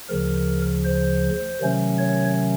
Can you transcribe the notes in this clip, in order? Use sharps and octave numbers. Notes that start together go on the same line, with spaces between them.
D2 C#3 F3 A#4
C5
C3 D#3 F#3 A3 C#4
C#5